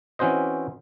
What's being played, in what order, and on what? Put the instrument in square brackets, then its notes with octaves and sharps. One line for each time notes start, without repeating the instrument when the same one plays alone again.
[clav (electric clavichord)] E3 C4 C#4 F#4 C5 D#5